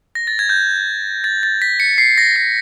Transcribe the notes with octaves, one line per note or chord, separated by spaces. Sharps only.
A#6
A6
G#6
G6
A6
A6
B6
C#7
C7
A#6
A#6